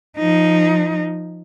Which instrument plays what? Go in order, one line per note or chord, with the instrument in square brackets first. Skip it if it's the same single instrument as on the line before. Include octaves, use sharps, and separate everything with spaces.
[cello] F3 D#4